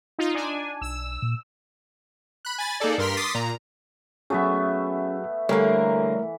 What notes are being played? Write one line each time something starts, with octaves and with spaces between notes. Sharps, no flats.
D#4 F4
D4 G#5
B1 E6
A#2
B5 F#6
G#5 B5 A6
A#3 D#4 G#4 A4 D5
G2 A#4 C6 F6 B6
C6 D6 D#6 A6 B6 C7
A#2 A#5
F#3 A3 B3 C#4 F#4 G#4 E5
D3 E3 G3 A3 A#3 A#4 C#5